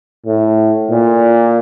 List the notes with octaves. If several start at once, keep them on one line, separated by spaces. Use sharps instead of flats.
A2
A#2